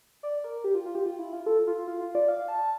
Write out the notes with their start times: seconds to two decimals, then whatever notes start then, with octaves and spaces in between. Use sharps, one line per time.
0.23 D5
0.44 A#4
0.64 G4
0.75 F4
0.85 F4
0.95 G4
1.06 F4
1.19 E4
1.33 F4
1.46 A4
1.67 F4
1.87 F4
2.01 F4
2.15 D5
2.28 F5
2.48 A5